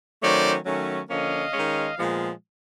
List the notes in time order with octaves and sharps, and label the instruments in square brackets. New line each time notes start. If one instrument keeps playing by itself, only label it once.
[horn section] D#3 F#3 A3 C#4 C5 D5
D#3 F#3 A3 C#4
D3 F3 A#3 C#4 D#5 F5
D#3 G#3 C#4
A#2 F3 G#3 B3